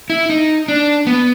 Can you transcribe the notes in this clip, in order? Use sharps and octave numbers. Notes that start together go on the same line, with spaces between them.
E4
D#4
D4
B3